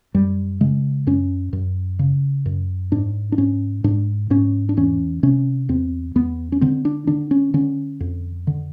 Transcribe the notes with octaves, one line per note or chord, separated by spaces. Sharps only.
F#2 G3
C#3 G#3
F#2 C#4
F#2
C#3
F#2
G#2 D4
D4
G#2 C#4
G#2 D4
G#2 C#4
D4
E2 C#4
C3 C#4
E2 C4
E2 B3
C#4
D3 C4
D4
D3 D4
C#4
D3 C#4
F2
D3